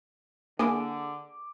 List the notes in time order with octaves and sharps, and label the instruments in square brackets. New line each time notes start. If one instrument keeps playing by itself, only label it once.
[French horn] D3 [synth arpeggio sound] A#3 D4 E4 [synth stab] G#4 [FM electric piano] D6